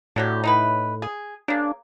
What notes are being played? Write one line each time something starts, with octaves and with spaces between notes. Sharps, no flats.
A2 D3 F#3 G4
D#4 E4 B4
G#4
C#3 A#3 D4